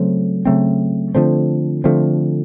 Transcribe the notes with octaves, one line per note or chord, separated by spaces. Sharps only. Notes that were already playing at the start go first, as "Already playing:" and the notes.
Already playing: C#3 F#3 A3 C4
C#3 F#3 A3 C4
D3 F3 A3 C4
D3 F3 A3 C4